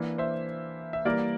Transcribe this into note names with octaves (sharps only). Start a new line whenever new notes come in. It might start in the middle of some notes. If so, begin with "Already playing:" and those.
Already playing: E3 A#3 D4
C5 E5
E5
E3 G3 A#3 A#4 D5